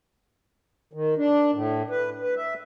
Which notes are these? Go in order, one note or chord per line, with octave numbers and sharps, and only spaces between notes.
D#3
D4
A2
B4
B4
E5